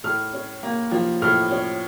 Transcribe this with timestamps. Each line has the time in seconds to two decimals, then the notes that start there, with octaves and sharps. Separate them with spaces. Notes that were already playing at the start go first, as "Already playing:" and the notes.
0.04 A2 F6
0.33 C#4
0.63 A#3
0.92 F3
1.22 A2 F6
1.51 C#4